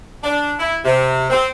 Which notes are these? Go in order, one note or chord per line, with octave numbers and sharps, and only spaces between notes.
D4
E4
C3
C4